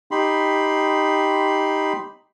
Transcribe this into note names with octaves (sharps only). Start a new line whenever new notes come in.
D#4 G4 B5 C6